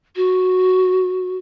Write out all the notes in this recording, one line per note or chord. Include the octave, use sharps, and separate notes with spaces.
F#4